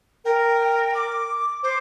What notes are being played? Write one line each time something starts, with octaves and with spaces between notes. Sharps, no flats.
A#4 G5
G5
D6
C5 D6